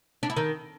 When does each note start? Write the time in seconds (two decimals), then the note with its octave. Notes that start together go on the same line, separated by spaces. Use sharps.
0.23 D4
0.30 E4
0.37 D#3